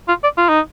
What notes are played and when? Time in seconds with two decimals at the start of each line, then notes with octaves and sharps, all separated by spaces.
0.08 F4
0.23 D5
0.38 F4
0.49 D#4